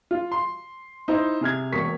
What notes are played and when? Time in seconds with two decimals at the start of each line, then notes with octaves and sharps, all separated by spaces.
0.11 F4
0.32 C6
1.08 D#4 E4 C5
1.41 C3 G#4 F6 G#6
1.72 E1 A#3 C#6 B6